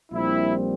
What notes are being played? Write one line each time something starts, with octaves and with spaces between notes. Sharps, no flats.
A#1 A#2 G3 C4 E4